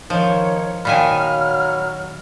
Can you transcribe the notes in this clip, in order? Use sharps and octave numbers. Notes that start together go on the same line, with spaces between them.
D#3 F3 C#5
A#2 D#3 F#3 F5 G#5 B5 F6